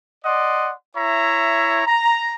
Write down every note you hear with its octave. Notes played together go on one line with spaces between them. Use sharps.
D5 D#5 F#5 C6
E4 C#5 E5 A#5
A#5